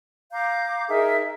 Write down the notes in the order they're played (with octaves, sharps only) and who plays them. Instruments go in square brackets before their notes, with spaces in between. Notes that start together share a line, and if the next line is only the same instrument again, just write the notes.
[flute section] F5 A#5 D6 G6
D#4 G#4 A#4 E5